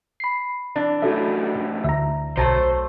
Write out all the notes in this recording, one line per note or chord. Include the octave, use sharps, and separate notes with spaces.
B5 C7
E3 D4
F#2 A2 F#4 A4 E5
D2 E5 A#5
B1 F#3 A3 C5 A5